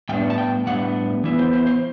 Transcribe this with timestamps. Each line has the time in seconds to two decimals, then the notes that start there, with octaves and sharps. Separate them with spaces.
0.09 A2 G3 B3 D4 G5
0.30 A5
0.38 G5
0.67 A2 G3 B3 D4 F#5
1.24 E3 B3 E4
1.39 C5
1.53 C5
1.67 C5